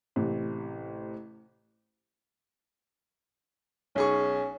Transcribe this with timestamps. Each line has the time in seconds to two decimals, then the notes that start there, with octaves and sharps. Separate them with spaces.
0.16 A1 C3
3.96 B1 C#4 G#4 C#6